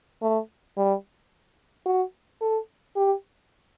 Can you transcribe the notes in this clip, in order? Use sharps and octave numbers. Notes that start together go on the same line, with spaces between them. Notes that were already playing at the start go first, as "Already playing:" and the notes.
A3
G3
F#4
A4
G4